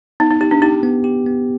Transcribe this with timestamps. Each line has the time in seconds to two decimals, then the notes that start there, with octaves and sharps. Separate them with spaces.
0.20 B3 D#4
0.30 D#4
0.41 D#4 G4
0.51 D4
0.62 D#4 G4
0.83 B3
1.04 G4
1.26 B3